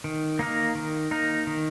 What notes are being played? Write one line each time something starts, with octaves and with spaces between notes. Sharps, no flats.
D#3
A#3 D#4 A#4
D#3
A#3 D#4 A#4
D#3